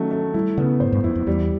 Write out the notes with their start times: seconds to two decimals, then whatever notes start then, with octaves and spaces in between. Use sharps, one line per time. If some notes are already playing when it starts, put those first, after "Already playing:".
Already playing: D#3 F#3 A3 C#4
0.11 A3
0.34 G3 E4
0.57 C#3 B3
0.80 G#2 C5
0.92 G2
1.04 F2 E4
1.15 F2
1.27 E2 G3